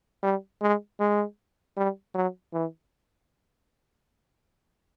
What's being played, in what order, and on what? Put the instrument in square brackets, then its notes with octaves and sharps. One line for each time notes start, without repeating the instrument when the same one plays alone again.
[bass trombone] G3
G#3
G#3
G3
F#3
E3